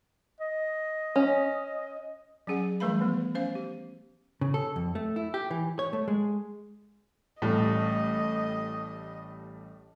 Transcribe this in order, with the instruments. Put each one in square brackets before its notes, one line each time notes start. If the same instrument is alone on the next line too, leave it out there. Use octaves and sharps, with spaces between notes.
[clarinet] D#5
[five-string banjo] C#4
[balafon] F#3 C#4 G#4 F#5
E3 G3 A3 B4 F5 B5
F3 B3
C#4 C5 F5
G4
[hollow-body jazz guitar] C#3
A4
F2
A3
E4
G4
E3
C#5
A3
G#3
[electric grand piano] A1 G3 [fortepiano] A2 [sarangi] D#5